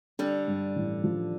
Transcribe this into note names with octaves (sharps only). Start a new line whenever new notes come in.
D3 G3 D4
G2
A1
F3